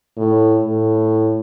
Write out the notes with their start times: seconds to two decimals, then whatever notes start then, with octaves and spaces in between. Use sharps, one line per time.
0.17 A2
0.64 A2